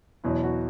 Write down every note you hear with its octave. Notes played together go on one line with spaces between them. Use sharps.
E2 B2 F#3 E4
F#4